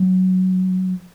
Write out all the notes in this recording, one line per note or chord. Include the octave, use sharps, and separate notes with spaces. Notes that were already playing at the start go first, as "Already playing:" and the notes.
Already playing: F#3